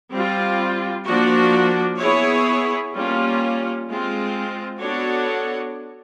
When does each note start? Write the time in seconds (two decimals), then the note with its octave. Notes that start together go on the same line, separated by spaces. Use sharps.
0.13 G3 C4 F4
1.07 F3 A#3 D4 F#4
2.00 B3 E4 G#4 C#5
2.94 G3 A#3 C#4 F4
3.87 G#3 C4 F4
4.80 B3 D4 F#4 A4 C#5